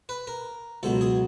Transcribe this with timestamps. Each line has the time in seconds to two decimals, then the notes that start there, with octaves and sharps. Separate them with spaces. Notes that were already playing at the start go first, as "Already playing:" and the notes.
0.09 B4
0.27 A#4
0.83 C#2 B2 F#3 A4
1.01 G#4